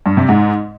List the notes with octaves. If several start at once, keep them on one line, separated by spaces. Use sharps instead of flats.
G2
C3
G#2